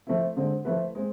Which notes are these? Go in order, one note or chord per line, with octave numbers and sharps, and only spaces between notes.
F3 A3 C4 E4
D3 G#3 C4
F3 A3 E4 B4
G#3 C4